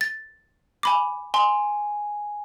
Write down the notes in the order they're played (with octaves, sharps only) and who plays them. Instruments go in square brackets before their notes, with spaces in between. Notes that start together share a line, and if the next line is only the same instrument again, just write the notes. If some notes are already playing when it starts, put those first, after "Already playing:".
[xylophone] A6
G#5 B5 D6
[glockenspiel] G#5 [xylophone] C6